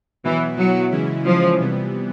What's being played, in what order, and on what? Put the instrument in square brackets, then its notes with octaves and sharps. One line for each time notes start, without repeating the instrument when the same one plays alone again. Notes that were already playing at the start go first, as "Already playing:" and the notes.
[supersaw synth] B2 F#3 B3 E4 [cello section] E3
[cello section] F#3
[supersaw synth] C#3 E3 G#3 C#4 E4
[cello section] F3
[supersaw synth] C3 E3 G3 B3